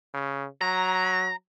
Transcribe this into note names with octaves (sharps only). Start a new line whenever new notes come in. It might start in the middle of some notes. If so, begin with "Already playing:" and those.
C#3
F#3 A#5